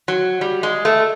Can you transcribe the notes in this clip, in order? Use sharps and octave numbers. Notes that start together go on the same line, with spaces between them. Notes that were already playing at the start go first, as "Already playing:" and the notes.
F#3
G3
G#3
A3